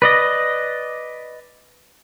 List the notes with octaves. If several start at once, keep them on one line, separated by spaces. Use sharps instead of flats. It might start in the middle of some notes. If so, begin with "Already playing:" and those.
B4 D5 D#5